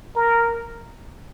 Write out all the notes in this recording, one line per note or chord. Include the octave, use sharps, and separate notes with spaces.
A#4